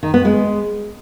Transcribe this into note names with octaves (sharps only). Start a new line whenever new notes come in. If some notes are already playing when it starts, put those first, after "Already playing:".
D#3
B3
G#3